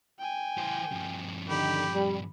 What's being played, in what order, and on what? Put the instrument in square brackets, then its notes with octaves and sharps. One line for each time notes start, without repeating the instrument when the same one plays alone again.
[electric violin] G5 G#5
[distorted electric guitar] E3 C5
G2 F3
[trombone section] D3 D#3 [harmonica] G4 [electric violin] B5
[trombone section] G3